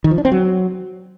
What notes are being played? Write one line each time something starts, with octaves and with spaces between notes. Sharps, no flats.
D#3
F3
D4
C4
F#3